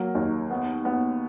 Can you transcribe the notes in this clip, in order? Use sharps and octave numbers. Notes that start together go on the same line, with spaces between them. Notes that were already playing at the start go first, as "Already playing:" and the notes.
Already playing: F#3 A#3
D#2
B3
B3